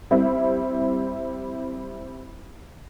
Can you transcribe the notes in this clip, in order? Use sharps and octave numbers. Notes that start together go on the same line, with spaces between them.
G3 C4 E4